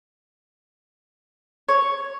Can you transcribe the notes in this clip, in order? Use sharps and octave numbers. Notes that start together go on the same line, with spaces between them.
C#5